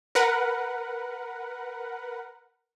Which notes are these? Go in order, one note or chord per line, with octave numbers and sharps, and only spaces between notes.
A#4 B4 F#5